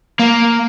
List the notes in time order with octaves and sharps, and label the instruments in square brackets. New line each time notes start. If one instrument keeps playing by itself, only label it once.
[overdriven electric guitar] A#3